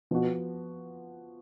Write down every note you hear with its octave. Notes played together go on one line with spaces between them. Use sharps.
B2 F3 B3 F#4